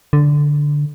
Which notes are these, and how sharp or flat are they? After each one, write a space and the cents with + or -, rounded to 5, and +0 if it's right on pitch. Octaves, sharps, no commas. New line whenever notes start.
D3 -5